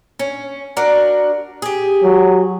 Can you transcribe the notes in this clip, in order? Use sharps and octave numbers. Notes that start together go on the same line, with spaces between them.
C#4
D4 F#4 A#4
G4 G#4
F#3